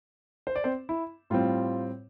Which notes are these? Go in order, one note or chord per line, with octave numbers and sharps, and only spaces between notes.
C5
D5
C4 C5
E4
A2 G3 C4 F4